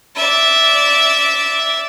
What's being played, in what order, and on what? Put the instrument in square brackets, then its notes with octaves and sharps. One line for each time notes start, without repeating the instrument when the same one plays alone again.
[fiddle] D5 E5